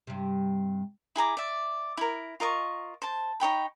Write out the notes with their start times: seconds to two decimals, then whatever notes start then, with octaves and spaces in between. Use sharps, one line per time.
0.07 G2 C3
1.16 E4 G#4 A#5 D6
1.37 D5 E5
1.97 E4 A#4
2.40 F4 A#4 D#5 C#6
3.02 C5 A5
3.40 D#4 C#5 G5 B5